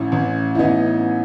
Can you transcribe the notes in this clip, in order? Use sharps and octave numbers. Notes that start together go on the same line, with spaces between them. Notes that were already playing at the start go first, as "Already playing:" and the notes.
Already playing: A1 C#4 E4
A1
E4
A1 B3 D#4